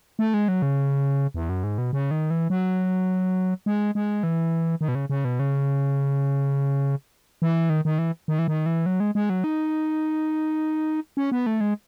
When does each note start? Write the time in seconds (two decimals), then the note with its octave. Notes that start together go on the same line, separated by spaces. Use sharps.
0.19 A3
0.34 G#3
0.48 F#3
0.62 C#3
1.34 E2
1.49 F#2
1.64 G#2
1.78 B2
1.93 C#3
2.11 D#3
2.30 E3
2.50 F#3
3.66 G#3
3.95 G#3
4.23 E3
4.81 D#3
4.88 B2
4.95 C#3
5.10 C#3
5.25 B2
5.39 C#3
7.42 E3
7.70 D#3
7.85 D#3
7.98 E3
8.28 D#3
8.39 E3
8.48 D#3
8.66 E3
8.86 F#3
9.00 G#3
9.15 G#3
9.30 F#3
9.44 D#4
11.17 C#4
11.32 B3
11.46 A3
11.61 G#3